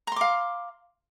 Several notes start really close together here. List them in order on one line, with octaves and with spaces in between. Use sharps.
A#5 C6 D6 F5